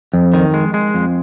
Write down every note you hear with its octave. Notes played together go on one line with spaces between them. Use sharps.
F2
D#3
G#3
G#3
F2